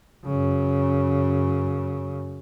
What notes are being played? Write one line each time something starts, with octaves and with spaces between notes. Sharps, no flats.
F#2 C#3